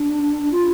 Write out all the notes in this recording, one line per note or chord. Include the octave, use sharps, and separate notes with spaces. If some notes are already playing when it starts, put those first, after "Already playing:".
Already playing: D4
F4